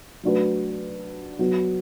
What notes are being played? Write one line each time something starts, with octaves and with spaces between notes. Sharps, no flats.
F#3 A3 D4 F#4 B4
F#3 B3 F#4